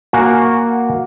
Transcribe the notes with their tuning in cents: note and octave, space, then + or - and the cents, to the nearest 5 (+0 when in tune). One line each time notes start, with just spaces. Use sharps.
A#3 +0 F#4 +0 G#5 +0